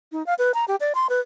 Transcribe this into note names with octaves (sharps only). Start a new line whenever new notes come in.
D#4
F5
B4
A#5
G4
D5
C6
B4